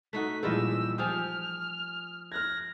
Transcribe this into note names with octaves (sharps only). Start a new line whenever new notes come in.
A3 D#4 F#4 B6
A#2 E3 F3 G3 G#3 D#5 E6
F3 G4 G#5 D#6 F6
F6 F#6 G#6 A#6